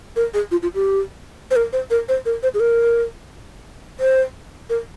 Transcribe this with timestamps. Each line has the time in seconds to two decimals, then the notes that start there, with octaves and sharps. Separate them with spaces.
0.16 A#4
0.34 G#4
0.51 F4
0.63 F4
0.74 G4
1.51 C5
1.56 A#4
1.73 C5
1.91 A#4
2.09 C5
2.26 A#4
2.43 C5
2.54 G#4
2.60 A#4
4.00 C5
4.70 A#4